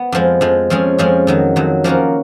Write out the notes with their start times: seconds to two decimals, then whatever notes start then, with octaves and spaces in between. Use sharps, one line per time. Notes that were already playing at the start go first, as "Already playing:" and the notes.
Already playing: B3
0.12 F2 F3 G#3
0.41 F2 F3 G#3
0.70 F2 F3 G#3 C#4 G#4
0.98 F2 F3 G#3 C#4 G#4
1.27 F2 D#3 F#3
1.56 F2 D#3 F#3
1.84 F3 A#3 C#4 F#4 A#4